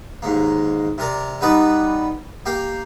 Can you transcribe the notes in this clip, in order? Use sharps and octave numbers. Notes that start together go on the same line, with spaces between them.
D#2 G#2 A#3
C3 A#4 D5
G3 B3 D#4 B4 D5
A#3 G4 F5 G5